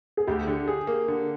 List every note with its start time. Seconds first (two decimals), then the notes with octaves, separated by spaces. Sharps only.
0.17 G#4
0.27 D2 G4
0.47 D3
0.68 G#4
0.87 A#3
1.08 D3